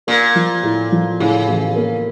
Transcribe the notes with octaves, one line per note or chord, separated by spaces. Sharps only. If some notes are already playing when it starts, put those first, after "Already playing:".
A#2 A#3
F3
A2
F3
A2 C#3
A1
A#3